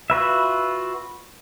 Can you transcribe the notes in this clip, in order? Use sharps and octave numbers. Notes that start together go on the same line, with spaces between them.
F4 F#4 B4 E5